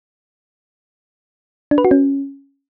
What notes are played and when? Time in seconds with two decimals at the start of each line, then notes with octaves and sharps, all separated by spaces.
1.71 D4
1.78 B4
1.85 F#4
1.91 C#4